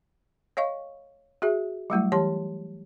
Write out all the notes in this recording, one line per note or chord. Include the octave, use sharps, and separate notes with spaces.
C#5 D#5 F5 C#6
F#4 G#4 E5
F#3 G3 A3 E4
E3 G4 C#5 A5 C6